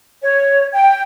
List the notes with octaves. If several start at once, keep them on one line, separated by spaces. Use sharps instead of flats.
C#5
G5